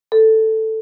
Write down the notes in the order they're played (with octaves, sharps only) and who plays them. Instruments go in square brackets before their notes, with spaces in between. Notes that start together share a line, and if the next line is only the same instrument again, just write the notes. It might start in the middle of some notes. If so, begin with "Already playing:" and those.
[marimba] A4